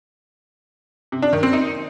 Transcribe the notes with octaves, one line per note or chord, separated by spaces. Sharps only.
C3
D4
D#3
C4
D#4